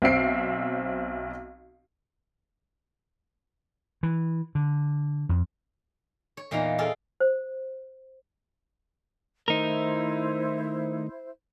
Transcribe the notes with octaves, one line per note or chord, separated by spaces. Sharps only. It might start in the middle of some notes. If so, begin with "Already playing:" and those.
B1 C4 E5 C7 D7
E3
D3
F2
C#5
E2 A#2 D#4 F4 F5 A#5
F4 G#4 A4 D5 F5
C5
D#3 A3 D#4 E4 A#4 C5